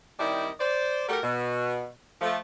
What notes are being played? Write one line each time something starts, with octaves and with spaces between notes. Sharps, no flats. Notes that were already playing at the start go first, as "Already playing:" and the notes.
D#3 G3 C4 E4 D5 D#5
C5 D5
A3 F#4 G4 A4 A#4
B2
F3 A3